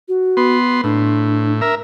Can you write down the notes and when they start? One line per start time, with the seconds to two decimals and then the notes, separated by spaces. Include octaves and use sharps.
0.08 F#4
0.37 B3 C6
0.84 A2 D4
1.61 A#4 E5